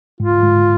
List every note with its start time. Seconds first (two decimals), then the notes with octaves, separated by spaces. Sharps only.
0.20 G#2 F4
0.43 G#2